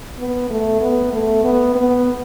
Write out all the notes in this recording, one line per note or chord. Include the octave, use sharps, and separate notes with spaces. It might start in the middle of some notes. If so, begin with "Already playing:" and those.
B3
A3
B3
A3
B3
B3